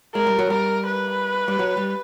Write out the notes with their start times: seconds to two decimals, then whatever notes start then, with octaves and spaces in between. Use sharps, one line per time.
0.15 G#3 A#4
0.27 G3
0.39 F#3
0.50 G3 A#4
0.87 B4
1.48 G3
1.59 F#3
1.77 G3